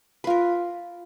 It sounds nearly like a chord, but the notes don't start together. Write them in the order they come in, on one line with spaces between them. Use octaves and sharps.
B4 F4 A#4